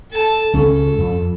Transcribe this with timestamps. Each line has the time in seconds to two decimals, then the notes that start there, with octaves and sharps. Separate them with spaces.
0.11 A4 A5
0.54 C#2 C#4 A4
0.98 F2